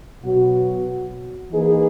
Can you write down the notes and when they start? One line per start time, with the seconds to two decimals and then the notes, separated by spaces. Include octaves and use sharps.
0.23 B2 F#3 B3 F#4
1.51 E3 A#3 D#4 G#4 B4